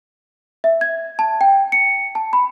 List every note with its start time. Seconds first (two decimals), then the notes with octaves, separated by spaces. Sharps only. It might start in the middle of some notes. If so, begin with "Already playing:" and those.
0.64 E5
0.81 G#6
1.19 A5
1.41 G5
1.72 C#7
2.15 A5
2.33 B5